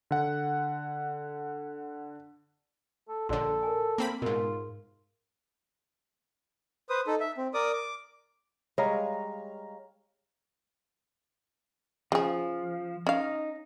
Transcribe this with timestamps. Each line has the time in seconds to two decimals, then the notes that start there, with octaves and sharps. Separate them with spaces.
0.11 D3 F#5
3.09 A4
3.29 A#1 D3 A4 C#5 D5 C6
3.63 A#4 G#5
3.98 A#3 C4 B5
4.22 G#2 B2 F4 A#4
6.89 B4 C5 D#6
7.07 D#4 A4
7.20 E5
7.37 C4
7.54 A#4 D5 D6 D#6
7.73 D6
8.78 G3 G#3 C#5 D#5 F5 A#5
12.12 C#3 F3 G#4
13.07 C#4 D#4 F5